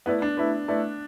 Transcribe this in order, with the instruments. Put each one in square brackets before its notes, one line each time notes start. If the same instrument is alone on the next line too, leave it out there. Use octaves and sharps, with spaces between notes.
[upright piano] A3 E4 B4 D5 [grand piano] B3
[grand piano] D4
[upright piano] A3 E4 B4 D5
A3 E4 B4 D5